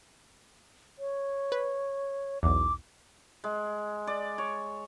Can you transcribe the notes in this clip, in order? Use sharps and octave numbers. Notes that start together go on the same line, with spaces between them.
C#5
B4
B1 E2 D6
G#3
D5
C#5